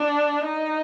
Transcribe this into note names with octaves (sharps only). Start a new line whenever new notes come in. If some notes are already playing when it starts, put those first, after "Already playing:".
Already playing: D4
D#4